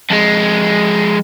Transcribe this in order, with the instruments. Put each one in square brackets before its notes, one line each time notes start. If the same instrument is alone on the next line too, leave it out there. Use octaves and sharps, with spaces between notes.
[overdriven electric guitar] F2 G#3